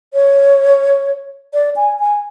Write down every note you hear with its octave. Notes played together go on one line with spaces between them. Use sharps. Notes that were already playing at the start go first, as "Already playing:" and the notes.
C#5
D5
G#5
G#5